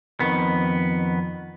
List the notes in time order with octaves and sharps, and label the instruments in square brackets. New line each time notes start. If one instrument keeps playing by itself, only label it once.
[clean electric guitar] F2 D#3 B3